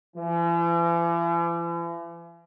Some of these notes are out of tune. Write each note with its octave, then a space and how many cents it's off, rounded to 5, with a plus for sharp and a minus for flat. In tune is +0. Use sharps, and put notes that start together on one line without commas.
E3 +45